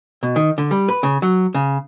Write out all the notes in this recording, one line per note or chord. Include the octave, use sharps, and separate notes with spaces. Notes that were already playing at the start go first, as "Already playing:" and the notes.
B2
D#3
D3
G3
B4
C#3
F#3
C#3